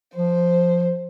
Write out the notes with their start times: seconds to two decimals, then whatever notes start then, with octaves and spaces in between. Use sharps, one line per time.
0.16 F3 C5